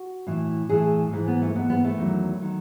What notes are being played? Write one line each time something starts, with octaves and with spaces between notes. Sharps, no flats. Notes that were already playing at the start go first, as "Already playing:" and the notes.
Already playing: F#4
A2 E3
A2 E3 G#4
G#2 E3
B3
A3
G#2 E3 B3
B3
A3
E2 D#3 F#3
D#3 F#3